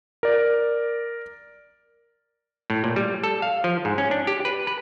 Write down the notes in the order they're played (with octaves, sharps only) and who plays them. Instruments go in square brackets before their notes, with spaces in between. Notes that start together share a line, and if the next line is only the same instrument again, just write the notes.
[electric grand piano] A#4 D5
[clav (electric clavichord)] A2
A#2
G3
A4
F5
F3
G#2
C#4
D4
G4
B4
B4